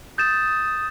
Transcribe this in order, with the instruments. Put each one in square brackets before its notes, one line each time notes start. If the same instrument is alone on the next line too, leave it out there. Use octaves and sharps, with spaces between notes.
[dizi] D#6 [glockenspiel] G6 A6 E7